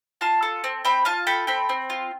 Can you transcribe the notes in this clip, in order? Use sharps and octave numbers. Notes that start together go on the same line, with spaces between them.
F4 A5 C6
A4
C4
C4 G5 B5
F4 F5 A5
A4 G5 B5
C4 G5 B5
C4
F4